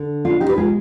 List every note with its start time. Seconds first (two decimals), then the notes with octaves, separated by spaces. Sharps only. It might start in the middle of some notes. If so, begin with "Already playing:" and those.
Already playing: D3
0.24 B2 D4 F4
0.40 D#4 G4
0.50 B4
0.58 G#3 F4 G#4